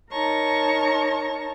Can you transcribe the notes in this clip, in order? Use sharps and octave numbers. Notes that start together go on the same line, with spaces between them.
D#4 A#4 C#5 A5 A#5 C#6